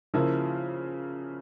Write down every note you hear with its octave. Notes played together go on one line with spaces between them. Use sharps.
C#3 F3 A#3 E4